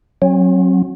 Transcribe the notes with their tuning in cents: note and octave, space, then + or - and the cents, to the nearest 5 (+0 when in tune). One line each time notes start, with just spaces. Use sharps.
F#3 +0 C4 +45